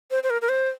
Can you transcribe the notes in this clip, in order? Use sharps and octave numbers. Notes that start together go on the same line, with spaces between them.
C5
C5
A#4
A#4
C5